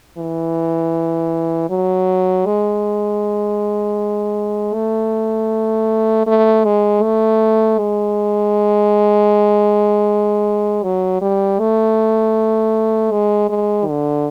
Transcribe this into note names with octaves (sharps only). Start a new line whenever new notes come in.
E3
F#3
G#3
A3
A3
G#3
A3
G#3
F#3
G3
A3
G#3
G#3
D3